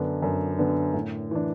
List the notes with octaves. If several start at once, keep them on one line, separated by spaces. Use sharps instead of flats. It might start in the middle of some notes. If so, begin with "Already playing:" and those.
Already playing: F#2 D3 B3 D4
F#2
D3 B3 D4
A2
E3 D4